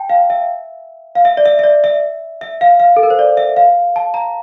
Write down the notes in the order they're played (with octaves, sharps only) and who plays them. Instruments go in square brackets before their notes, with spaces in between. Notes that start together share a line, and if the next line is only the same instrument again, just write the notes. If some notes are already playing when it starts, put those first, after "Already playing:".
Already playing: [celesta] G5 A5
F5
E5
F5
E5
D5
E5
E5
D5
E5
E5
F5
F5
A4
A#4
C5
D5
E5
F5
A5
A#5